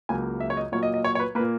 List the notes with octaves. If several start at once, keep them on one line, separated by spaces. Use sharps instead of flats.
C#2 C#3 F#3 A#3 G#5
E5
C#5
D#5
A#2 F#3 A#3 C#5
D#5
D#5
C#5
C#5
B4
A#2 A#3 B4